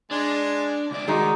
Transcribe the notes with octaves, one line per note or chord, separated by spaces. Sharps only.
G#3 D4 D5
C#2 D5 D6
D#3 G#3 D#4 F#4